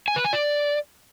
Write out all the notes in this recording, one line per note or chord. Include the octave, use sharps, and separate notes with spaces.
G#5
B4
G#5
D5